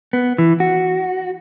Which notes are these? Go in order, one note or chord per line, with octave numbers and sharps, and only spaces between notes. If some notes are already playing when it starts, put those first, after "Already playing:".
B3
E3
F#4